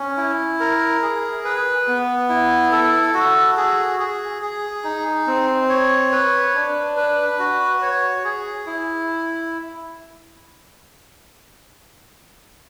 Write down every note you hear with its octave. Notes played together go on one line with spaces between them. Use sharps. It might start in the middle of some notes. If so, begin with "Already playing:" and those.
Already playing: C#4
E4
A#4
G#4
B4
B3
E4
A4
F#4
G#4
G#4
G#4
D#4
C4
C#5
B4
D4
B4
F#4
C#5
G#4
E4